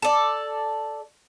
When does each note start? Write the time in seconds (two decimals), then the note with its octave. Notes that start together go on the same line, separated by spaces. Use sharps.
0.02 A4 D5